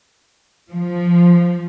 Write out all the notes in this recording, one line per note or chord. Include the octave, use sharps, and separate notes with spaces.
F3